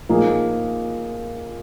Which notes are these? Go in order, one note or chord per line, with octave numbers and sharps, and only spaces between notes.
A#2 F3 A#3 D#4 G#4